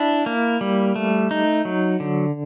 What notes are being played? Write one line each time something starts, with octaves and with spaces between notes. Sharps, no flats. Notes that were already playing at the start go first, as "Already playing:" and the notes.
Already playing: D4 E4
A#3
G3
A3
D#4
F#3
D3